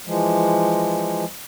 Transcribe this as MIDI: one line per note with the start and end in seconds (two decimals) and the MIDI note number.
0.06 1.24 52
0.06 1.24 53
0.06 1.24 56